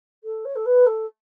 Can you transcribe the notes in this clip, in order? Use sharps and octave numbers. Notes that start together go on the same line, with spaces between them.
A4
C#5
A4
B4
A4